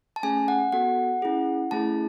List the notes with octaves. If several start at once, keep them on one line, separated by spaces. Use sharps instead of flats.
A5
A3 C#4 G#4 G#5
F#5
B3 F#4 A4 F#5
C#4 E4 G#4
A3 C#4 E4 G#4 A5